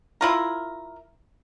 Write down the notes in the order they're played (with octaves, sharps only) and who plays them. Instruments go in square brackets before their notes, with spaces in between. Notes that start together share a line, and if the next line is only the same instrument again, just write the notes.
[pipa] E4 F4 A#4